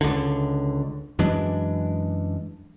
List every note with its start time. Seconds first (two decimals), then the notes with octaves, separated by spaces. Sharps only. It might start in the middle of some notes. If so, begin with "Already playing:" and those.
0.01 C#2 D3
1.19 F#2 E3 G#3 D4